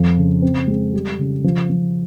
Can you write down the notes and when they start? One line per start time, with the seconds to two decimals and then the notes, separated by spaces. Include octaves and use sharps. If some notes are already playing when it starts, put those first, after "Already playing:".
Already playing: F2 F3
0.17 C#3
0.42 C4
0.68 G#3
0.93 G3
1.19 C#3
1.44 F3
1.70 F3